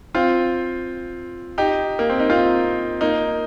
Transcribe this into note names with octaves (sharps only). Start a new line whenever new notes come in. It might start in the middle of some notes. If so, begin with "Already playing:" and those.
C4 F4
D#4 G4
A#3
C4
D#4
C4 F4
A#3 D#4